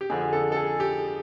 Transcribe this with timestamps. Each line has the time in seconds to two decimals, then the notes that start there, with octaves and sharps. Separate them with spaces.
0.01 G4
0.09 F2 D3 F3 G#4
0.33 A4
0.52 A4
0.56 G#4
0.80 G4